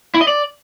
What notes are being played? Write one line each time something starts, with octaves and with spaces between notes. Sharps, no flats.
E4
D#5
D5